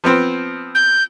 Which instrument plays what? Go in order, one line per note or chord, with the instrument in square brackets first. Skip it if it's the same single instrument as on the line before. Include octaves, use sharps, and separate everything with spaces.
[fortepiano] F3 B3 C4
[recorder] G6